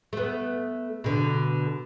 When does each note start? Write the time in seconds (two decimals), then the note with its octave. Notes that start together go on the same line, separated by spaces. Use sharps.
0.13 A3 B3
1.04 B2 D3